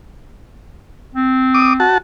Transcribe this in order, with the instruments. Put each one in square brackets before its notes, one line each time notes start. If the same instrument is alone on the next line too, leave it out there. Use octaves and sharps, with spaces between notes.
[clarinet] C4
[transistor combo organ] D6 D#6
F#4 A5